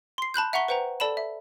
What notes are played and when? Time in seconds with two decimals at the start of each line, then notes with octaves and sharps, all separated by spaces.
0.18 C6 C7
0.34 A5 B5 F#6 G6
0.53 E5 F#5 A#5 C#6 B6 G7
0.68 B4 C5 F#5 G5 A#5
1.00 A4 D5 A5 B5 E7
1.17 E5